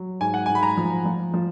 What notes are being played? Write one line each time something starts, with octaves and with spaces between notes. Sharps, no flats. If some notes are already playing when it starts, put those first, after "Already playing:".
Already playing: F#3
G#2 G#5
F#5
G#2 G#5
B5
A#5
F3
F3
F3